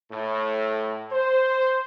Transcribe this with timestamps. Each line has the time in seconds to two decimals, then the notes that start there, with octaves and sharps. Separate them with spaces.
0.12 A2
1.12 C5